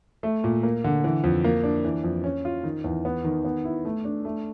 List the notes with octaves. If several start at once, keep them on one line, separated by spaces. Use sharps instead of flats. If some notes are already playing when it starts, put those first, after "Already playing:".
A3
A#2
A#3
D3
E3
F2
A#3
D4
E3
F2
C#4
F4
D#3
E2
B3
D#3
B3
E4
A3
D4
A3